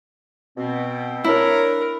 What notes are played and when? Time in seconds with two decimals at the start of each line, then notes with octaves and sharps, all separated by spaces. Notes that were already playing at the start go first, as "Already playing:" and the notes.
0.56 B2 C4
1.24 D4 E4 A#4 C#5